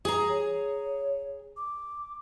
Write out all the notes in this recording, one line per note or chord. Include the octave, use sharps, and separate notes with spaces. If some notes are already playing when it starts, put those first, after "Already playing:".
G#4 G#5 A#5
C#5
D6